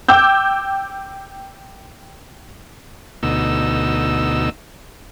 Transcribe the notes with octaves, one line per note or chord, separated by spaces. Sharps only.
G5 D6 E6 G6
D2 B2 D#4 E6